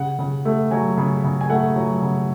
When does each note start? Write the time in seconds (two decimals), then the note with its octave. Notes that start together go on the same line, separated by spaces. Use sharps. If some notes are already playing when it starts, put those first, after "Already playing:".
Already playing: C#3 F#5
0.19 C#3
0.45 A3
0.71 F#3 G#5
0.97 C#3
1.24 C#3
1.41 G#5
1.50 A3 F#5
1.76 F#3
2.02 C#3